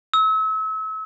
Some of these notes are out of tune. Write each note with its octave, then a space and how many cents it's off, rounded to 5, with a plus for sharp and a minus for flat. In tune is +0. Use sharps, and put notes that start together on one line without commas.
E6 -35